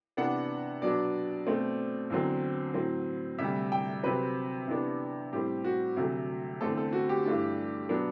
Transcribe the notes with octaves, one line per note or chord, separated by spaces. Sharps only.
C3 E3 B3 D4 F#5
B2 F#3 B3 D4 D5
B2 A3 C4
E2 D3 F#3 C4
A2 F#3 C4
D2 C3 G3 E5
G5
C3 F#3 C4 B4
C3 E3 B3 D4
A2 G3 C4 G4
F#4
D2 C3 F#3 A3
E2 D3 A3 C4 A4
A4
F#4
G4
G2 E3 A3 D4
B2 F#3 B3 D4